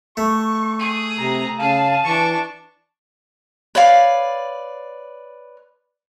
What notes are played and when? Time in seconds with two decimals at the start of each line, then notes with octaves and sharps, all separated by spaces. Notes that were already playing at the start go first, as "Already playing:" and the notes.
0.17 A3 C#6
0.79 G#4
1.18 C3 A#5
1.59 C#3 G#4 F5 A5
2.04 E3 D4 C#6
3.75 B4 C#5 D5 F5